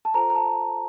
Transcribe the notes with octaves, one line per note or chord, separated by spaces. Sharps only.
A5
F4 A4 C5 A#5
A#5
A5